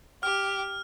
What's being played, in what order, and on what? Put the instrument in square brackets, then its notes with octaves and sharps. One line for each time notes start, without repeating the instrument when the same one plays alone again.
[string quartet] G4 [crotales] F6